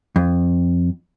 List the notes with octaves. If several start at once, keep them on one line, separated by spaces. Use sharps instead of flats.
F2